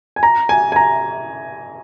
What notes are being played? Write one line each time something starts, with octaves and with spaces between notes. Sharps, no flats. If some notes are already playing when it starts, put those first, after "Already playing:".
G#5
A#5
G#5
G#5
A#5